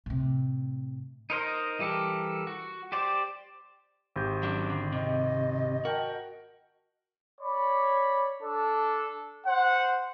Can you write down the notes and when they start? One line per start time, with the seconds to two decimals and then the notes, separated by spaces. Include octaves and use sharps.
0.06 A2 C3
1.30 D#4 A#4 C5 D#5
1.79 E3 G3 G4 A4 A#4
2.47 F#4
2.92 G4 C5 D5
4.16 G#1 G4 G6
4.43 F#3 C#4 D4
4.70 D3
4.92 C3 D#5
5.85 F#4 A#4 G5 A5
7.41 C#5 D5 B5
8.43 D4 A4
9.47 C5 F#5